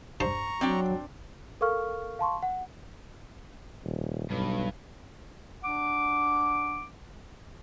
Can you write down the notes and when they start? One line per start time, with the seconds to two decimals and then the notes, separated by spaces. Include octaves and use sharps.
0.20 G2 C5 A5 A#5 C#6
0.61 F#3 C4 D4 G5
1.61 A4 A#4 F5 C#6 F6
2.19 F5 A5 C6 C#6
2.43 F#5
3.84 D#1
4.30 B1 G2
5.63 D4 F#5 D6